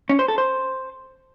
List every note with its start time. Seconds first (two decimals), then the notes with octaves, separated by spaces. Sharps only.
0.09 C#4
0.19 C5
0.28 A4
0.38 C5